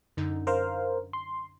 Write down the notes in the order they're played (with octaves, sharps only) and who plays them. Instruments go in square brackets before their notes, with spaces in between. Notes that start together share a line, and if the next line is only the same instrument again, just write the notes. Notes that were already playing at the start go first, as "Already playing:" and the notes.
[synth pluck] F#2 D3 D#4
[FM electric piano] A#4 C5 F5
C6